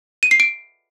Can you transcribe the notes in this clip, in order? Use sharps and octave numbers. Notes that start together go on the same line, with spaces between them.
D#7
C7
D7